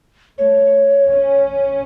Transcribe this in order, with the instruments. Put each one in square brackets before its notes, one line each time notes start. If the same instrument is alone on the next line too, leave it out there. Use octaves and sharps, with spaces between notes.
[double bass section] A3 [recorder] C#5
[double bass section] C#4